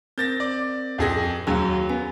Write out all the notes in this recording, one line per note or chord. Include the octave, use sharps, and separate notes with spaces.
C4 A#4 C5 G6 A6 A#6
D5
F2 G#4 A#6
D#2 F#3 G#4 F5
B3 G#5